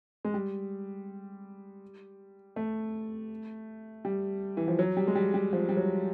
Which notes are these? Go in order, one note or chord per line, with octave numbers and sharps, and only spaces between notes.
G#3
G3
A3
G3
E3
F3
F#3
G3
G#3
G3
G3
F3
G3
F#3